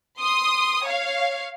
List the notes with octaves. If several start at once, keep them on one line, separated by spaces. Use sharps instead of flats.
C6 D#6
C#5 F5